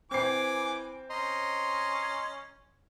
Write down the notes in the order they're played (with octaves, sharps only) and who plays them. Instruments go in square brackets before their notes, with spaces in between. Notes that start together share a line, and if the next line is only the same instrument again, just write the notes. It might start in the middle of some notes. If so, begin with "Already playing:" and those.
[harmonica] E3 G#5 D6 [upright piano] C4 C7
[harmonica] C#4 [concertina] D#5 A#5 C6